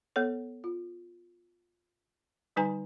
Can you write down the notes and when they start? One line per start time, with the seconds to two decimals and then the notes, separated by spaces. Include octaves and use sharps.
0.16 B3 A4 C#5
0.64 F4
2.56 D3 G3 D#4 B4 G#5 A#5